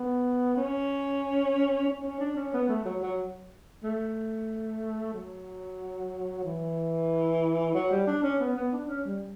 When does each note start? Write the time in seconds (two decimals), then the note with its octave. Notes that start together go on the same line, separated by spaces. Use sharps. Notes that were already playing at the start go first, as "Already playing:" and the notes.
Already playing: B3
0.57 C#4
1.88 C#4
2.04 C#4
2.20 D4
2.36 C#4
2.53 B3
2.69 A3
2.85 F#3
3.02 F#3
3.83 A3
5.13 F#3
6.44 E3
7.74 F#3
7.91 G3
8.07 D4
8.23 C#4
8.40 B3
8.56 B3
8.72 D4
8.88 C#4
9.05 G3